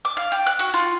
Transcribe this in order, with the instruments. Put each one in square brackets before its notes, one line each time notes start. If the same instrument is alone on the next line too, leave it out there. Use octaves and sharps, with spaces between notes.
[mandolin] D6
F5
G5
F#6
F#4
F4